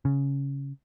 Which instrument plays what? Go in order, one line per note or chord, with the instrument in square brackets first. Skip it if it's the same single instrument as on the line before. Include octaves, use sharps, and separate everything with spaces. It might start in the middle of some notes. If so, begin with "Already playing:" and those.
[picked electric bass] C#3